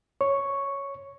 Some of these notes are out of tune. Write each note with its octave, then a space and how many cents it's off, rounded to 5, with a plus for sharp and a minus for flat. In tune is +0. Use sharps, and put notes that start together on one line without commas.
C#5 +0 C#6 +0